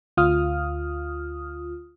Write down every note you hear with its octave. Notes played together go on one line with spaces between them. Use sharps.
D2 F4 D#6 F6